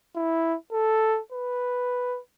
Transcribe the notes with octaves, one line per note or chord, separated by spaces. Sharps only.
E4
A4
B4